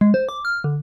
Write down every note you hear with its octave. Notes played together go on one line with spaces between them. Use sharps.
G#3
C5
D6
F6
D3